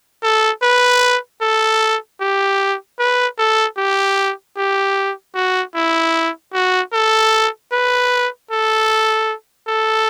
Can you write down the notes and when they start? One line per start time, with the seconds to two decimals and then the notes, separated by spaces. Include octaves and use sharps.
0.23 A4
0.62 B4
1.41 A4
2.21 G4
2.99 B4
3.38 A4
3.77 G4
4.57 G4
5.35 F#4
5.75 E4
6.53 F#4
6.93 A4
7.72 B4
8.51 A4
9.68 A4